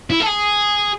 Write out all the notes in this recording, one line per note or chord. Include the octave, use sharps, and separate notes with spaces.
E4
A4
G#4